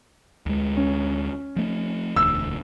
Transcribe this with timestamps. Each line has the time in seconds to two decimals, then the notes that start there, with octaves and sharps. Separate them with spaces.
0.46 D2 G#3
0.77 C#4
1.56 F3 A3
2.16 E1 D2 E6